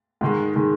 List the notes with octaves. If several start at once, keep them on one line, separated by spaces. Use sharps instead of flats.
G#2 D#3 G#3
D#3 G#3